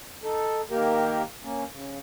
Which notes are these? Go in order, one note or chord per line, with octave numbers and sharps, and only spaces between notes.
D#4 A4
D#3 A#3 G4 A#4
A#3 C#4
C#3